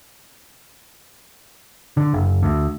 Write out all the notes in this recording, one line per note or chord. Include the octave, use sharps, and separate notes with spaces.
D3
F#1
D2